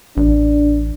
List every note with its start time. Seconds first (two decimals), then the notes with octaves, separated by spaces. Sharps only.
0.17 A1 D4